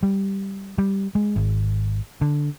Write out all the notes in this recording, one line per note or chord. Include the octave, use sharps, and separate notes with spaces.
G3
G3
G#3
G#1
D3